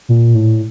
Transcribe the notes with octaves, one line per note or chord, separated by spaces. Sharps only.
A#2
A2